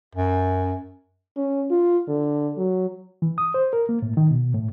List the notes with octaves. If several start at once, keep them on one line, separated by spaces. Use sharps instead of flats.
F#2
C#4
F4
D3
F#3
E3
D#6
C5
A#4
A#3
A2
D#3
B2
A2